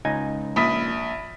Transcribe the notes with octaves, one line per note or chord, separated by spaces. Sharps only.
C#2 D#4 G#5
A#1 B5 D#6 B6